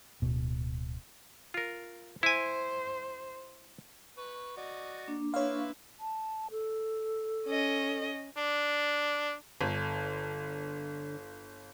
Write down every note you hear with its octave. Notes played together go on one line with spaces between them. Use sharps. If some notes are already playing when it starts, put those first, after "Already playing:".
D1 B2
F4 A#4
E4 C5 G#5
B4 C#6
F#4 D5 D#5
A#3 D4
E4 B4 C#5 F5 C6
A5
A4
C#4 D#5
D4
G1 D3